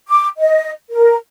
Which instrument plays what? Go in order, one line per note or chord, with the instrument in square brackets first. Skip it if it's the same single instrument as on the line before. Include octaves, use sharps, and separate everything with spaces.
[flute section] D6
D#5
A#4